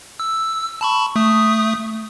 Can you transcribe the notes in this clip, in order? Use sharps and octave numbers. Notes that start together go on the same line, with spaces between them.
E6
A5 B5 C#6
A3 D#6